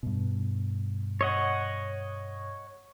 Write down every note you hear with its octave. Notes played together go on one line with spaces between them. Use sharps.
G2 B2
C#5 D#5 F#5